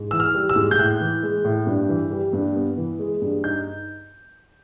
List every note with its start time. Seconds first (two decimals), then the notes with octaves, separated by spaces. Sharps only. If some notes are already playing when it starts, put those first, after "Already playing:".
Already playing: G#2
0.11 E3 E6
0.20 F6
0.34 G3
0.49 E6
0.56 G#2
0.71 G6
0.79 A2 F#6
1.01 E3
1.23 G#3
1.45 A2
1.67 G2
1.89 E3
2.11 G3
2.33 G2
2.55 B3
2.77 E3
2.99 G#3
3.22 G2
3.44 D#4 G6